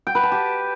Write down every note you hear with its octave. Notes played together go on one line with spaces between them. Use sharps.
G5
B4
A5
G4